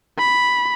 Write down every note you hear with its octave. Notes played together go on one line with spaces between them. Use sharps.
B5